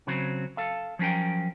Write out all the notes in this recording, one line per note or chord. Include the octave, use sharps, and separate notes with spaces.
C#3 F#3 C4
A4 F5
F3 F#3 C#4 A#4 G5